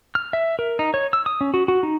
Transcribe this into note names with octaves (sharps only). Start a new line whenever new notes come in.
F6
E5
A#4
D#4
C#5
E6
D#6
C#4
F#4
F#4
D#4